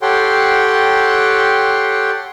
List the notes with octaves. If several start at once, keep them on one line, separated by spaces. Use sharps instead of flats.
G4 A4 C#5 F#5 G5 C6